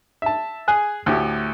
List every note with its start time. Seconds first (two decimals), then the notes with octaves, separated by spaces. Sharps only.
0.22 E5 A5
0.68 G#4 G#5 F#6
1.06 D2 A2 G4